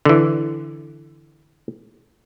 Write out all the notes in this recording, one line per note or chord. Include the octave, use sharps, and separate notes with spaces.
D3 E3